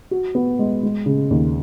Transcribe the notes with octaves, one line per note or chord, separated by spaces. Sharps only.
F#4
B3
G#3
G#3
C#3
D#2